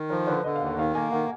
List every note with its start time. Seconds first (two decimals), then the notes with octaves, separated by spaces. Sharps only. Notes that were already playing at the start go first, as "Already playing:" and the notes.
Already playing: D#3
0.10 F3 A#4
0.27 D3 B4
0.44 D3 D#5
0.56 F5
0.61 D#2
0.67 F#5
0.78 D#3 F5
0.95 A#3 G#5
1.12 D#3 F#5